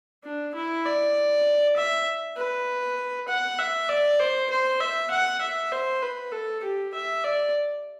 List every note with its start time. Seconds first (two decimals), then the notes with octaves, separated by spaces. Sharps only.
0.24 D4
0.55 E4
0.85 D5
1.76 E5
2.37 B4
3.28 F#5
3.59 E5
3.89 D5
4.19 C5
4.50 C5
4.80 E5
5.11 F#5
5.41 E5
5.72 C5
6.02 B4
6.32 A4
6.63 G4
6.94 E5
7.24 D5